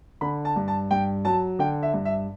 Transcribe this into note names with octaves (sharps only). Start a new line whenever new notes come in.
D3 B5
A5
G2
A5
G2 G5
F#3 A5
D3 G5
E5
G2
E5